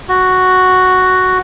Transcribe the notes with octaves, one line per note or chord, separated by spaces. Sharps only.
F#4